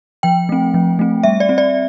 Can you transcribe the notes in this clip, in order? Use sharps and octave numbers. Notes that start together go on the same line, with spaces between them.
F3 G5
A3 C4
F3
A3 C4
G3 E5
D5
C4
D5